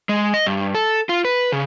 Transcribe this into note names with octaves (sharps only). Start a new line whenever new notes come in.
G#3
D#5
G2
A4
F4
B4
C#3